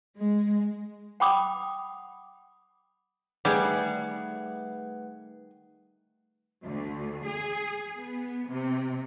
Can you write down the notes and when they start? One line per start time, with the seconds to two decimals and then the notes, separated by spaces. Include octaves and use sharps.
0.17 G#3
1.20 F#5 G5 B5 D6 D#6
3.45 D#3 G3 A3 G#4 B4 F#5
6.65 D2
7.27 G#4
7.96 B3
8.50 C3